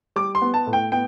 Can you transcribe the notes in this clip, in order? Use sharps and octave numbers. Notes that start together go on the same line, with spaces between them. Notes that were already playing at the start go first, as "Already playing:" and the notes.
G3 D6
C6
B3
A5
A2
G5
B3 G5